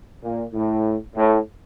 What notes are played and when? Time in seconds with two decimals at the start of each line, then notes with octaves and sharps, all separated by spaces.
0.23 A#2
0.53 A2
1.15 A2